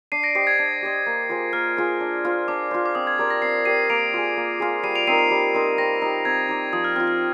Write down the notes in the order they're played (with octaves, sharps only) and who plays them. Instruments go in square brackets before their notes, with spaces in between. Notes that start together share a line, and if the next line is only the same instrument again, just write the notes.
[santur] D4 [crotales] C7 D#7
[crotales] A#6 D7
[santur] G4 C5 D#5 [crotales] C7
[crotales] G#6
[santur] D4
G4 C5 D#5
A#3
F4 G#4 C5
[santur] A#3 [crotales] F6
[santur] F4 G#4 C5
D4
F4 C5
[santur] D4 [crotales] D6
[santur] F4 C5
[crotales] D6
[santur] C4 [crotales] D#6
[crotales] G#6
[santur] G4 A#4 D5 [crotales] G#6
[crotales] A#6
[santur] C4 [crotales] C7
[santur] G4 A#4 D5 [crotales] C7 D#7
[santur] A#3 [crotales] D7 F7
[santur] F4 G#4
A#3
F4 G#4
[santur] G3 [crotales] C7 D#7
[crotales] D7 F7
[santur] C4 D#4 A#4 [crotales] C7 D#7
[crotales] C7
[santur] G3
C4 D#4 A#4
[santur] C4 [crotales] A#6
[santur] D#4 G4
[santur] C4 [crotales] G#6
[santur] D#4 G4
[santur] F3 [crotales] D#6
[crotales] F6
[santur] C4 [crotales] F6
[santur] F4
[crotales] F6